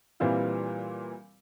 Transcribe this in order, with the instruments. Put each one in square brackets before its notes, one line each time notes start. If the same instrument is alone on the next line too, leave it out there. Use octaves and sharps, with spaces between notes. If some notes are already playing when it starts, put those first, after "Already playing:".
[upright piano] A#2 E3 G3 C4 E4 F4